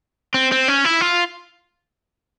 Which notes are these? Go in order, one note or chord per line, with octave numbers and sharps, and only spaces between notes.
C4
C4
C#4
E4
F4